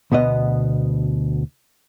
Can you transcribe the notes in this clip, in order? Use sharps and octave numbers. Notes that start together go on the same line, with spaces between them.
D2 B2 B3 D#5